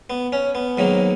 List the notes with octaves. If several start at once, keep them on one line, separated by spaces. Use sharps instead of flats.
B3
C#4
B3
G#2 D#3 F#3 A#3